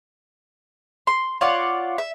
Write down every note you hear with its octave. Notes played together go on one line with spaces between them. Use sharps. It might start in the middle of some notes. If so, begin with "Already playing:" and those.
C6
F4 C#5 D5 F#5
E5